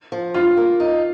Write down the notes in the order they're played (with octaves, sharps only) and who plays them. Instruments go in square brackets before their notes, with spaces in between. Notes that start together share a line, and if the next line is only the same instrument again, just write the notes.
[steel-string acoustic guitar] F3
[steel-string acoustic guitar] G2 [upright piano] F4
[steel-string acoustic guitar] A#3
D#4